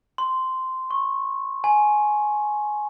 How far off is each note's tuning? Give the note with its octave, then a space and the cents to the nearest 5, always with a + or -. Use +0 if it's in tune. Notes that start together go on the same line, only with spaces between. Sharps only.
C6 -10
C#6 -20
G#5 +15